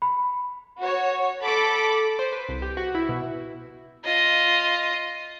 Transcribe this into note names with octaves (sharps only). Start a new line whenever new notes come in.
B5
F#4 C#5
A4 B5 D6
C5
B4
C2
G4
F#4
E4
B2
F4 D#5